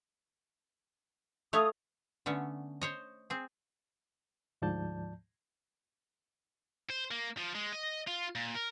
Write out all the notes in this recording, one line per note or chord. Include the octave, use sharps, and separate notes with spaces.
A3 C#5 F5 D#6
D3 A3 B3 C#4
C5 C#5 D#5
C4 G#4
D2 G#2 F3 D5 A5 G6
C5
A#3
F3
G#3
D#5
F4
A#2
A#4